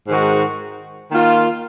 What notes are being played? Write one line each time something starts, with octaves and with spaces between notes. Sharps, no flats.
G#2 D#3 G#3 D#4 F#4
D#3 A#3 F4